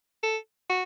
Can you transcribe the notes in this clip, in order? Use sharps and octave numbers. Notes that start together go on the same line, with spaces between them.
A4
F#4